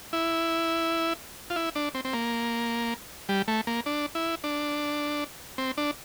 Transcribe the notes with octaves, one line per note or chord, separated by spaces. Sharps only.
E4
F4
E4
D4
C4
C4
A#3
G3
A3
A#3
D4
E4
D4
C4
D4